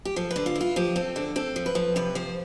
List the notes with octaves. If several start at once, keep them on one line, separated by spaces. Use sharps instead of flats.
G4
F3 A4
B4
D3
F4
E4
F4
F3 G4
C4 A4
D3 A4
C4 A4
F3
B4
F3
C3 B4
F3 C5